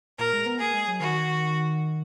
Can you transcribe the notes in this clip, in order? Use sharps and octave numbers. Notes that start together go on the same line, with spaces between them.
A#2 A#4
G#3
B3
A#3 G#4
G#3
F#3
D#3 F#4